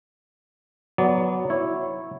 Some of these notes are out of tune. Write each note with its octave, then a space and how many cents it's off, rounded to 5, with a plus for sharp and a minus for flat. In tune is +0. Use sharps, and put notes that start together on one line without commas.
F#3 +0 B3 +0 D5 -25
E4 +0 C#5 -15